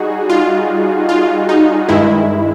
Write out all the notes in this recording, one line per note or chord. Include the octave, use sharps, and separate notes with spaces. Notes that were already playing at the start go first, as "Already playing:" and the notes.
Already playing: G3 D#4 F#4 G#4
F4
F4
D#4
G2 D#3 G#3 E4